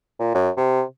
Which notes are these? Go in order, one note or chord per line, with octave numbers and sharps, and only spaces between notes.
A#2
F#2
C3